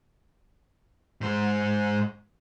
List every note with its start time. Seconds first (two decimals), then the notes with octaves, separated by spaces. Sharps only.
1.21 G#2 C5